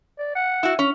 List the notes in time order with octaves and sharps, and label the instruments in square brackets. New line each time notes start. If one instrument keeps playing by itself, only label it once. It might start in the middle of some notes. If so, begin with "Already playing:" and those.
[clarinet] D5
F#5
[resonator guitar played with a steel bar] E4 F#4
C#4